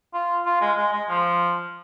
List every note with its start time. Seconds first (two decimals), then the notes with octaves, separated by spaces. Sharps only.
0.14 F4
0.45 F4
0.61 G#3
0.77 G#3
0.93 G#3
1.09 F3